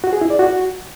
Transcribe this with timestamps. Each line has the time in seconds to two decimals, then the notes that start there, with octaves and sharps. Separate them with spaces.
0.04 F#4
0.13 G#4
0.21 E4
0.30 D5
0.39 F#4